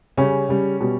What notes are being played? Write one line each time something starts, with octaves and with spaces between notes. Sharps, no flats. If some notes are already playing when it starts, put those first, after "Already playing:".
C#3 G3 C#4
C#3 G3
B2 G3